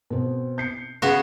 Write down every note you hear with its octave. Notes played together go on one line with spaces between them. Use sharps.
B2 C4
G6 C7 C#7
C#3 B3 F#4